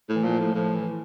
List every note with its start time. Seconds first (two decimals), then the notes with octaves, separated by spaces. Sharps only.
0.09 A2
0.15 E3
0.24 A#2 F3
0.39 A2
0.55 A2 F3
0.75 E3